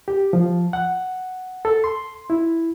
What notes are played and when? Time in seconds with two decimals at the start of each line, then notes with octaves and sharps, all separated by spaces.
0.08 G4
0.33 F3
0.73 F#5
1.65 A4
1.84 C6
2.30 E4